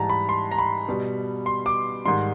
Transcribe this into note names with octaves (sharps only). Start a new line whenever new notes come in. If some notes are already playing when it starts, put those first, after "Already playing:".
Already playing: G#2 E3 G3 A5 A#5
B5
C6
A#5
B5
B2 G3
C6
D6
G#2 D#3 G3 C6